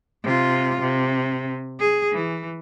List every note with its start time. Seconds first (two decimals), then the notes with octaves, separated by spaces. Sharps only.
0.24 C3 F4
0.81 C3
1.79 G#4
2.13 E3